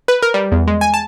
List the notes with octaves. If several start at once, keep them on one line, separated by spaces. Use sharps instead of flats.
B4
A#4
G3
E2
G#3
G#5
A5